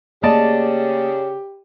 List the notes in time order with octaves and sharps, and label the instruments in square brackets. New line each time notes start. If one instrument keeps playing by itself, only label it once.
[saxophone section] C#3 [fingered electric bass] A3 A#3 [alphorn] G4 [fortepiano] D5 D#5 A5